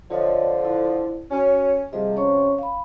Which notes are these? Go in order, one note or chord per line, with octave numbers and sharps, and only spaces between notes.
D3 F3 F4 C#5 D#5
E4
C#4 F#4 C#5
C3 F3 G3 G#4 D#5
C#4 C#5 C#6
F5 B5